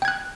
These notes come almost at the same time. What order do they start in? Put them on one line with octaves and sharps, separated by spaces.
G5 G#6 F#6